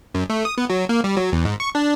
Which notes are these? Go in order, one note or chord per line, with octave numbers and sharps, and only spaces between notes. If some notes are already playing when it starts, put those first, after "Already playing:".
F#2
A3
D#6
B3
F#3
A#3
G3
F#3
E2
G#2
C#6
D4